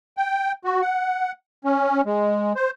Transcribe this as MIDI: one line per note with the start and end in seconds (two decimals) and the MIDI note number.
0.17 0.52 79
0.65 0.81 66
0.82 1.32 78
1.65 2.01 61
2.06 2.53 56
2.56 2.71 72